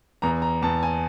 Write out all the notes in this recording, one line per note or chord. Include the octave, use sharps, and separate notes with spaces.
E2 A#5
A#5
E2 A5
G#5